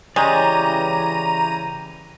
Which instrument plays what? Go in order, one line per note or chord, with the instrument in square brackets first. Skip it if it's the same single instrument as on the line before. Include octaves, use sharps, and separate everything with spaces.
[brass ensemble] C#3 E3 [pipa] G#3 [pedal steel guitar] G4 C#5 D5 [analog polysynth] A#5 D#7